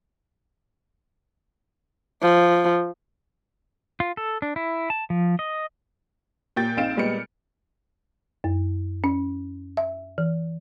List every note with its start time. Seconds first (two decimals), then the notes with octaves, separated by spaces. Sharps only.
2.22 F3
4.00 F4
4.17 A4
4.42 D4
4.56 E4
4.90 A5
5.10 F3
5.39 D#5
6.56 A#2 G4 G5 G6 A6
6.77 A#1 C4 D#4 F5 D7 E7
6.97 A#2 G3 G#3 B3 F6 C#7
8.44 F#2
9.04 C#4
9.77 E5
10.18 E3